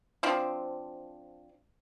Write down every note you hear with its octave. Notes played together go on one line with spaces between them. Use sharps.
F3 C4 D4